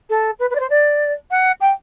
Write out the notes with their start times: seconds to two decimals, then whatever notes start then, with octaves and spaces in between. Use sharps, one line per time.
0.09 A4
0.39 B4
0.50 B4
0.55 D5
0.60 C5
0.70 D5
1.31 F#5
1.61 G5